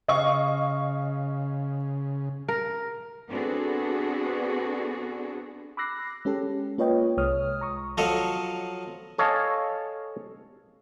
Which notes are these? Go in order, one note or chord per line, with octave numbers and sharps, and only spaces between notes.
C#3 D#5 F5 C#6
A#4
B3 C4 D4 F#4 G#4 A4
B5 D6 E6 F#6 A#6 C7
G#3 C#4 G4 A4
A#3 F4 B4 C#5 D#5 G5
C2 G#3 C#5 D#6 F6
A#5 C#6 D#6
F3 F#3 A4 C#5 D#5 F5
A4 C#5 D#5 F5 G#5 A5